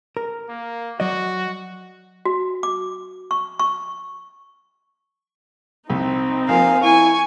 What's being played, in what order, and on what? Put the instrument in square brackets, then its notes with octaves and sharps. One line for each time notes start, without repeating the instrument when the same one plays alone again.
[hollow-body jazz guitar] A#4
[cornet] A#3
[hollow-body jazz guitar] F#3 D5 D#5 [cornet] F#4
[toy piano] F#4
D6
C#6
C#6
[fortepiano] C2 [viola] C4 D#4
[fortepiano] F3 A#3 [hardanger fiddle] F5 [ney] G#5
[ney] E4 [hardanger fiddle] G#5 [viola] C#6